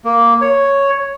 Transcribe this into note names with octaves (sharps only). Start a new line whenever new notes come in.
A#3
C#5